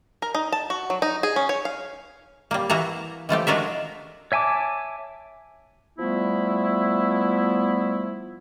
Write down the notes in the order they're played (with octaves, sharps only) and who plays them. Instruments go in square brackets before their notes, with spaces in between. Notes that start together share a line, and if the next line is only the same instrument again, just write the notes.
[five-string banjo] A#4
D#4
A5
F#4
F#3
D#4
G#4
C#4
C#5
F5
[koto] G3 A#3
E3 A#3 E4 F#4 E5 A#5
E3 F3 A3 G4
G#3 D4 F4 F#4 A#4 E5
[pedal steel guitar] C#5 E5 G#5 A5 D6
[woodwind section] F3 G3 A3 B3 E4